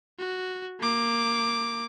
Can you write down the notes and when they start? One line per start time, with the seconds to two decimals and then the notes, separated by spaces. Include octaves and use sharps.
0.19 F#4
0.80 A#3 D6